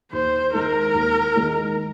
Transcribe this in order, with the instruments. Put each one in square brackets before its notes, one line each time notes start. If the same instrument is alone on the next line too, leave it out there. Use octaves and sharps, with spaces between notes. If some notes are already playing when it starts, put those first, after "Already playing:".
[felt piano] D#2 [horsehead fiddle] C5
[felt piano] D#3 G#3 D#4 [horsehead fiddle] A#4
[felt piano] D#2
D#3 G#3 D#4